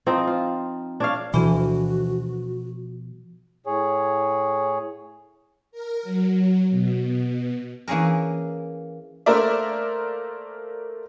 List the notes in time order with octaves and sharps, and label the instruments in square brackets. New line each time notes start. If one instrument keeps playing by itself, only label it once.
[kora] F3 C4 D#4
F4
D4 C#5 F5
[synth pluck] D2 E3 [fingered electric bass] B2 F3 [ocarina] F#4
[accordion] A2 G#4 C#5
[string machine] A#4
F#3
B2
[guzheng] E3 A#3 C#4 G#4 A#4
[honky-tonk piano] A3 A#3 A#4 C5 D5 E5